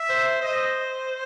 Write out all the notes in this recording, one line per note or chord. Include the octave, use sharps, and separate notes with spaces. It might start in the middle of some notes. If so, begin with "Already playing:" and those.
Already playing: E5
C5
C5 D#5